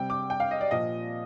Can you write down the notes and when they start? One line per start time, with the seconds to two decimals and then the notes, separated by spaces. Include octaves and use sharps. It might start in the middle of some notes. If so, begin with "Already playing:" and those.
Already playing: C3 G3 G5
0.10 D6
0.30 G5
0.40 F5
0.51 D#5
0.61 D5
0.71 A#2 F3 D#5